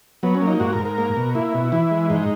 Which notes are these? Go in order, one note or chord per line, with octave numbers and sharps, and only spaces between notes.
F#3 B3
C#4
A#3
D#4
G#2 F#4
A#4
G#2
A#4
A#3
B2
A#3 E4
B2
E3 E4
G#3
G#2 D#4